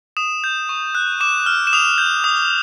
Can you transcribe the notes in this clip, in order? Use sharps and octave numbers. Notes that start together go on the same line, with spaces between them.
D#6 E7
G6
C#6
F#6
D6 E7
F6
E7
D#6 F7
G6
D#6